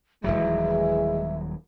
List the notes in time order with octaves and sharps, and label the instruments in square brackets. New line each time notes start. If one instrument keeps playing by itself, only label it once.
[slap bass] D#1 B1 F#3 [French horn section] E3 G#3 [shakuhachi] E5